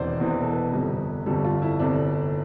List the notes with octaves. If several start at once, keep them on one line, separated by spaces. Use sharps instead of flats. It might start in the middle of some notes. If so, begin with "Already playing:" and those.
Already playing: E1 E2 C3 E3 C5 D5
E1 E2 C3 E3 C5
B4
A4
B4
G1 F2 C3 G3
G1 F2 C3 G3 A4
F4
E4
G1 F2 C3 D4